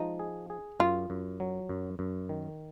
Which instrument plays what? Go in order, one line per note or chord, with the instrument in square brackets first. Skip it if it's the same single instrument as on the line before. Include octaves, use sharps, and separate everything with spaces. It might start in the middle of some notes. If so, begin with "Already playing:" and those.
Already playing: [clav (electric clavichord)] F3 G#3 [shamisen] D#4
[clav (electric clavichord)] G#4
G#4
[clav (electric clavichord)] F#2 [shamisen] F4
[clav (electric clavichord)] F#2
F#3
F#2
F#2
D#3